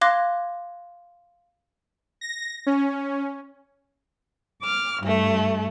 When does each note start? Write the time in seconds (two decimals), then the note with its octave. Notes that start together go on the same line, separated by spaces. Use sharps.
0.01 F5 C6 D6 F#6 G#6 A#6
2.21 A#6
2.66 C#4
4.62 D6 F6
5.02 G2 A3